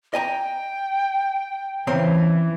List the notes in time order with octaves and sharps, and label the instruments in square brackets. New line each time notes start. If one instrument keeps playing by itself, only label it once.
[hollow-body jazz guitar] D#5 G#5 A#5 [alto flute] G5
[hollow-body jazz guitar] C#3 C4 A#5 [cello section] E3